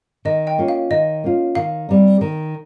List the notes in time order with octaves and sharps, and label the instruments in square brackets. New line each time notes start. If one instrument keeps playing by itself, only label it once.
[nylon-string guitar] D#3 [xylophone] D#5
[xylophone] D#5 G5
[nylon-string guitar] A#3 C#4 F4
[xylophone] F5
[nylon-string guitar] D#3 [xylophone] D#5
[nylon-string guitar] A#3 C#4 F4
[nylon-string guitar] D#3 [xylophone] F5
[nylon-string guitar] G3 C4 D#4
D#3